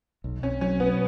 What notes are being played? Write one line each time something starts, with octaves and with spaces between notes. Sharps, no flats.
B1
B1 C#4
F#3 C#4
B2 B3